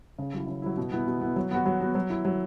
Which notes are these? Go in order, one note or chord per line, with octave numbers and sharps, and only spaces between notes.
C#3
F#3 E4
C#3
F#3 E4
B2
B3 E4
B2
B3 E4
F#3
B3 F#4
F#3
B3 F#4
F#3
E4
F#3